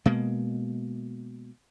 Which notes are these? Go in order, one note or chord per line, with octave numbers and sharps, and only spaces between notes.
B2 G#3 A#3